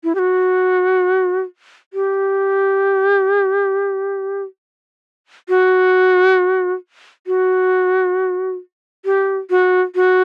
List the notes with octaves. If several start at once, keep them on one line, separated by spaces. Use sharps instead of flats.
E4
G4
F#4
G4
F#4
F#4
G4
F#4
F#4